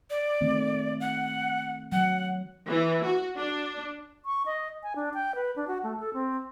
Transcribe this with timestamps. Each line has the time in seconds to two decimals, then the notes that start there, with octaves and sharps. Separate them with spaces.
0.10 D5
0.41 D#3 A3 C4
1.00 F#5
1.92 F#3 F#5
2.67 E3
3.05 F#4
3.37 D4
4.26 C#6
4.46 D#5
4.83 G#5
4.96 D4
5.14 G5
5.35 B4
5.56 D4
5.68 F#4
5.83 A3
6.00 A4
6.14 C4